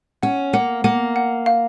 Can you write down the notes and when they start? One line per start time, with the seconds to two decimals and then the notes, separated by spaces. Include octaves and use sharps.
0.23 C#4 F#5
0.53 A#3 F#5
0.84 A#3 F#5
1.16 F#5
1.46 F5